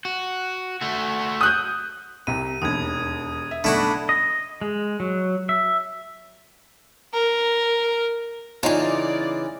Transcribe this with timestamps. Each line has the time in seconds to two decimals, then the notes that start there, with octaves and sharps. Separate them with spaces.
0.05 F#4
0.81 A3 F#4
1.41 D#6 F#6 G6
2.27 C2 C3 A#5 D#7
2.62 E1 D#2 D#6 G#6
3.51 E5
3.64 B1 A3 D4 E4 F#4 B5
4.09 D#5
4.61 G#3
5.00 F#3
5.49 E5
7.13 A#4
8.63 C#3 E3 D#4 F4 D5